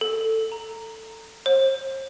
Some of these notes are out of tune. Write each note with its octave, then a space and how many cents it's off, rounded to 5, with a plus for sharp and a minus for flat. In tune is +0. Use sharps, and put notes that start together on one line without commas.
A4 +15
A#5 -10
C5 +40